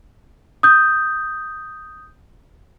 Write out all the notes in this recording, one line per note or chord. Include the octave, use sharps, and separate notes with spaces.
D#6 G6